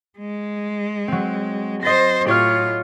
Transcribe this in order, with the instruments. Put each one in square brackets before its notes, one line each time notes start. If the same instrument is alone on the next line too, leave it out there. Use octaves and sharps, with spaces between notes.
[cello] G#3
[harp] F#3 C4
[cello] C5 [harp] D#5 A6 A#6
[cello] A2 F4 [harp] G4 C#5 F6